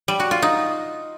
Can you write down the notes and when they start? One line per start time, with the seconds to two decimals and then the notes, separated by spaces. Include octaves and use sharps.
0.08 G3
0.20 F#4
0.31 F4
0.42 D#4